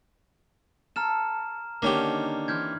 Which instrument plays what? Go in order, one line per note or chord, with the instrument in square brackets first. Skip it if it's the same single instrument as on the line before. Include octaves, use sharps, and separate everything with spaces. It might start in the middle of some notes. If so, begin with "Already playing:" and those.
[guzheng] A4 [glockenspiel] A#5 F6 E7
[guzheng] D3 D#3 [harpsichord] A#3 C#4 G4
[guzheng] E3 C4 [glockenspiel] F6 G6 G#6